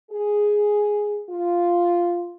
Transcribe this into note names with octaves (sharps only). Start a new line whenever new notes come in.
G#4
F4